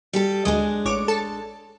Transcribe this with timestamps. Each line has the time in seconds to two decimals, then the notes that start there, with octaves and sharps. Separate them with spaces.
0.13 G3 G4 A4
0.45 D2 G#3 D4 D#5
0.85 A1 C#5 D6
1.08 A4 A5